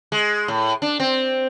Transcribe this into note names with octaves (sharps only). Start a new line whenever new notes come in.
G#3
A2
D4
C4